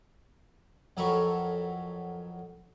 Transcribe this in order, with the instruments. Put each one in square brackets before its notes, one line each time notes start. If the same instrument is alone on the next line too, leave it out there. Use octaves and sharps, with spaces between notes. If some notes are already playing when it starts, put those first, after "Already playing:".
[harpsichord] F2 F#3 A4 A#4 B5 C#6